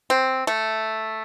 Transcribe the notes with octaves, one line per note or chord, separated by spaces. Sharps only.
C4
A3